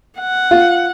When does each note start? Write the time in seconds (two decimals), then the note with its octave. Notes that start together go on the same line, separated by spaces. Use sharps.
0.20 F#5
0.51 F4